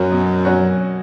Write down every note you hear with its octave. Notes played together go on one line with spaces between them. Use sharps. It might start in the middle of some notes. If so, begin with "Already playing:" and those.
Already playing: F#2 F#3 C#4 F#4
B2
F#3 C#4 F#4